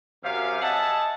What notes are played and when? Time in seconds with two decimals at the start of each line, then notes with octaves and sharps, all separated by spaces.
0.23 F#2 C3 F5
0.62 D#5 E5 F#5 G#5 A5